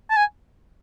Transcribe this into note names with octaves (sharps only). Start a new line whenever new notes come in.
A5
G#5